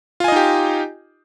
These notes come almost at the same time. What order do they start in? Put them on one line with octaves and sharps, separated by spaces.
F4 G#5 D#5 D#4 G4